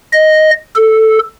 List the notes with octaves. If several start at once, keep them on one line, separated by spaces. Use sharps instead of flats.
D#5
A4